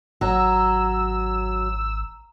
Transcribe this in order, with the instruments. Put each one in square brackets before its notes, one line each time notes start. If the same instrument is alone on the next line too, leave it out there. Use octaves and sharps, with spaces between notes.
[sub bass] G#1 [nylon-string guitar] F#3 [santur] A#5 [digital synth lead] E6